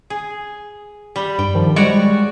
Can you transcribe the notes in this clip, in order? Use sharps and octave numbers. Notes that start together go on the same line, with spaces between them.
G#4
G3 B5
G2 G5
D#3 F3
G3 G#3 F#4 C#5 D5